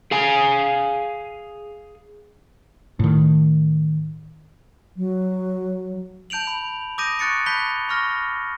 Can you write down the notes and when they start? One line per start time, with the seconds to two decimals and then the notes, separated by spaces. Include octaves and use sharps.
0.11 G#4 F5 G#5
3.00 A2 D#3
4.97 F#3
6.30 A5 G6 D7 F7 F#7
6.47 B5
6.98 D6 D#6 G6 A#6 D7 D#7
7.19 C#6 F#6 A6 C#7 D7
7.46 A5 B5 F#6 G6 B6 G7
7.89 B5 C#6 F6 A#6